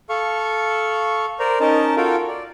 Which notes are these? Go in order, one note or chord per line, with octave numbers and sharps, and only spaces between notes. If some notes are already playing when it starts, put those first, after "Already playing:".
A4 F5 C#6
A#4 C5 D5 A#5
C#4 D#4 A#4 D#5 A5
F4 F#4 A4 A#4 F5 G5
D5